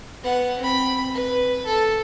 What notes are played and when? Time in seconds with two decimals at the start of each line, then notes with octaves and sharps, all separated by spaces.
0.23 B3 F#5
0.59 C4 B5
1.15 B4
1.66 A4